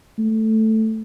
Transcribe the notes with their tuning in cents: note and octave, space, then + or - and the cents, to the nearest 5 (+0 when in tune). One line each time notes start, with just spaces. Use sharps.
A3 +0